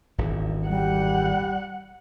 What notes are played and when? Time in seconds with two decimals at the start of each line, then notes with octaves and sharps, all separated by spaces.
0.18 D#1 G#1 E2
0.68 G3 F#5